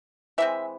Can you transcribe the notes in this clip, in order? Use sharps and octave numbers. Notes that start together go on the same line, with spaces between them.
E3 G#3 C4 E5